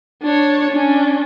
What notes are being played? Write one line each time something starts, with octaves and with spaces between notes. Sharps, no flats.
D4 C#5
C#4 D4